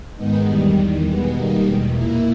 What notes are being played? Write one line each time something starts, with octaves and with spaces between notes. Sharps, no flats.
G#2 D#3 G#3 B3 D#4
E2 D#3 G3
E2 D#3 G3
B2 G#3 B3
D#3 G3 A#3 D#4
E2 B2 G#3
A#2 A#3 E4